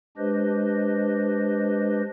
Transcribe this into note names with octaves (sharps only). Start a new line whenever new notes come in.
G#3 D4 G4 B4 C5 D#5